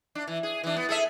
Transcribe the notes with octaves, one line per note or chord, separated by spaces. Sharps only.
D4
E3
G#4
E3 D4
B3
G#4 A4 E5